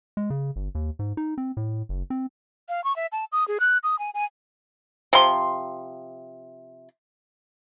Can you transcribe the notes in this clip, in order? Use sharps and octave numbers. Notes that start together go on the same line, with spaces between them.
G#3
C#3
G1
D#2
G#2
D#4
C4
A2
F#1
C4
F5
C#6
E5
A5
D#6
G#4
F#6
D#6
G#5
G#5
C3 F3 C6